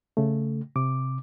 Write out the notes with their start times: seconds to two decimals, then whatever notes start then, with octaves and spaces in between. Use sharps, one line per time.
0.17 C#3 A3
0.76 C3 D6